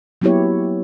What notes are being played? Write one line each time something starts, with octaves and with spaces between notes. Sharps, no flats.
F#3 A#3 B3 E4 G4 C#5